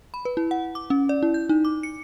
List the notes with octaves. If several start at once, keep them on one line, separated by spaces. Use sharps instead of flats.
B5
B4
E4
F#5
D6
C#4
D5
E4
G6
D#4
D6
C#7